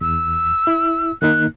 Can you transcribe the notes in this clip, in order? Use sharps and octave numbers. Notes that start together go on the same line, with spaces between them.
E2 E6
E4
D#3 A#3 D#4 F#6